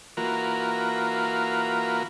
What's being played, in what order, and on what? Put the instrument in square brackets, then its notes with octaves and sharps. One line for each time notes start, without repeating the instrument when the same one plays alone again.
[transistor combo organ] E3 A#3 F4 F#4 A#4 B5